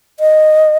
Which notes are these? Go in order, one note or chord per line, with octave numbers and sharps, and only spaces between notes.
D#5